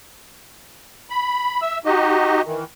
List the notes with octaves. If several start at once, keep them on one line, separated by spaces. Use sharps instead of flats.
B5
E5 E6
D#4 F#4 G4 D#5
D#3 E3